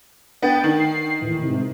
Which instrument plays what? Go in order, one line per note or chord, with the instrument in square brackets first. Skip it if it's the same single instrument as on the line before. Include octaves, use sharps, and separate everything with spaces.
[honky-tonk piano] B3 [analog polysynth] D4 G5 A6
[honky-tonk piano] D#3
[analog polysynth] C7
D#2 A2 E3
G#2 C3